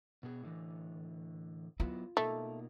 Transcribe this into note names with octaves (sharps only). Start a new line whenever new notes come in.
B2 B3 G#4
A2 D3 E3
F#3 B3 E4 F4
B2 A3 A#3 D#4